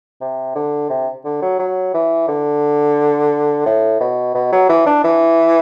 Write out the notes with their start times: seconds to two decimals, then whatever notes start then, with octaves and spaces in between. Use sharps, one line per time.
0.21 C3
0.55 D3
0.90 C3
1.25 D3
1.42 F#3
1.59 F#3
1.94 E3
2.28 D3
3.66 A2
4.00 B2
4.34 B2
4.52 F#3
4.69 E3
4.86 D4
5.04 E3